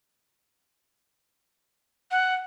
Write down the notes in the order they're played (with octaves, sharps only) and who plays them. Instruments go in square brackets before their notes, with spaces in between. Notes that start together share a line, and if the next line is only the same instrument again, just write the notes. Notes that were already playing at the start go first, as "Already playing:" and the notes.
[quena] F#5